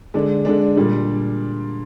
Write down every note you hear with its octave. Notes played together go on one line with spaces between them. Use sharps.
D3 G#3 D4
D3 G#3 D4
A#2 G3 D4